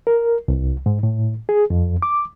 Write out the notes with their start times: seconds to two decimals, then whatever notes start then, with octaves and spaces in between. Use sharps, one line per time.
0.07 A#4
0.48 C2
0.86 G#2
1.03 A2
1.49 G#4
1.70 F2
2.02 D6